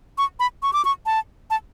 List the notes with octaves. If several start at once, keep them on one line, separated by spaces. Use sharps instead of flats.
C#6
B5
C#6
D6
C#6
A5
A5